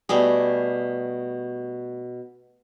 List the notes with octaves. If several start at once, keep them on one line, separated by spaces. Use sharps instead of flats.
B2 G3 A3 G#4